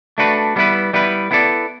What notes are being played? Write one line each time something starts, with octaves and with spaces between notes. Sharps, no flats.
A3 D4 F#4 B4
G3 B3 E4 B4
G3 B3 E4 B4
B3 E4 A4 D5